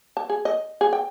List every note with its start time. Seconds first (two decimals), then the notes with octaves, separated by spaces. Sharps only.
0.17 A5
0.30 G#4
0.45 D#5
0.81 G#4
0.93 G5